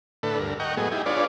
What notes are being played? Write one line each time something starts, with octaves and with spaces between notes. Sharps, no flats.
A2 D3 A4 B4
D2 G2 A#4
D#5 F#5 G5 A#5 C#6
A2 F#3 G#3 B3 G#4
D#4 E4 G4 G#4
D4 F4 G#4 B4 C#5 D5